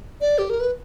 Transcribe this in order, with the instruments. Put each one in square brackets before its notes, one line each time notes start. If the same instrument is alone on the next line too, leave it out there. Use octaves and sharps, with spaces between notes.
[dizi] D5
G4
A#4
B4